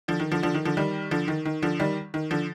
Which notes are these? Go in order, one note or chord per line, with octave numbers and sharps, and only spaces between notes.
D3 F3
D#3
D3 F3
D3 F3
D#3
D3 F3
D#3 G3
D3 F3
D#3
D#3
D3 F3
D#3 G3
D#3
D3 F3